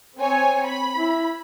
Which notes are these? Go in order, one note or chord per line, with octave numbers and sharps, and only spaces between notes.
C4 C#5 G#5
B5
E4